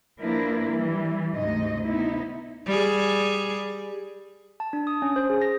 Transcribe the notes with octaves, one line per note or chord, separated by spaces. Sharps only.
F3 A#3 D4 E4 A#4 B4
E3 G3
D2 G#2 C3 D#4 D#5
C3 B3 D#4 E4
G3 G#4
A5
D4
D#6
C#4
C5
G#4
A#6